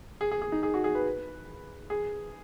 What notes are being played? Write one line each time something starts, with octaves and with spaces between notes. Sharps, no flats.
G#4
G#4
G#4
D#4
G#4
F#4
G#4
B4
G#4